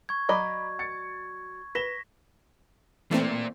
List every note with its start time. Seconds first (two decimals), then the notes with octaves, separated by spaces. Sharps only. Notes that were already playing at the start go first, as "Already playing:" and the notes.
0.09 C#6 G#6
0.29 F#3 D5 D#5 A#5 B5 D6
0.79 A6 C#7
1.75 B4 A#6 B6 E7 G7
3.11 E3 A3 A#3 C4 D5